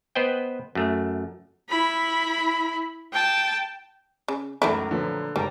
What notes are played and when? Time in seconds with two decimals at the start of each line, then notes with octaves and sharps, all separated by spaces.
0.15 B3 B4 C5 D#5 G5
0.75 F#2 A3
1.70 E4 B5
3.13 G5 A5
4.28 C#3
4.62 C#2 F#2 D#3 A3 E4 A#4
4.91 A#2 D3 F3 F#3 B4
5.36 F#1 G#2 G3 A#4 G5 A5 A#5